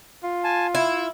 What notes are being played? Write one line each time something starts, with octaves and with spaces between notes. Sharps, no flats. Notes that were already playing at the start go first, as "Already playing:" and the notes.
F4
G#5 A5
E4 E6